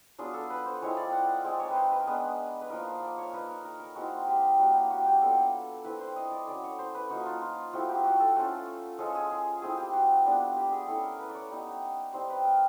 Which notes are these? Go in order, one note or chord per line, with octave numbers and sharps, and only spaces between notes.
F#3 B3 D4 F4 G#4
A4
B4
C5
F3 G#3 C4 E4 C#5
D5
F#5
F5
G#3 C4 D#4 D5
C#5
B4
C5
B4
A#4
G#3 B3 D4 B4
B4
F3 A#3 D#4 A#4
C5
D5
C#5
A#3 D#4 B4
A#4
A#4
A#4
G#3 C4 E4 F#4
G4
G3 A#3 D4 F#4
G4
F#4
G4
F#3 B3 D4 F4 A4
A3 C4 E4 B4
C5
D#5
D5
F#3 A3 C#4 D5
C#5
C5
B4
F3 A#3 D#4 F#4
F4
F4
F3 A3 C4 E4 F#4
G4
F#4
A4
A3 C#4 F4
F3 G#3 C#4 F4 A4
G#4
G#4
A3 C4 E4 G#4
G4
F#4
G3 B3 D4 F4
G4
G#4
A3 C#4 E4 A4
A#4
B4
D5
C#5
G3 B3 D#4
G3 C4 D#4 C5
B4
A#4